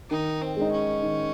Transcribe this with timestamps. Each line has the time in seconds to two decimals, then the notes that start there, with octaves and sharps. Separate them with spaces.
0.11 D#3 D#4
0.42 C4
0.57 G#3 D#4
0.72 C#4
1.03 D#3